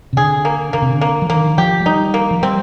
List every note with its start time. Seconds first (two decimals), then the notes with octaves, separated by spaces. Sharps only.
0.13 C3
0.16 D3 G#4
0.45 A#3
0.73 D3 A#3
0.82 C3
0.91 D3
1.01 A#3
1.22 F3
1.30 D#3 A#3
1.58 F3 G4
1.80 G#3
1.86 G3 D#4
2.14 A#3
2.31 F3
2.42 G3 C4